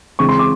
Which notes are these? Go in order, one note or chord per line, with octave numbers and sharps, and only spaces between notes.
C#3 E3 G#3 C4 C#6
C6
D6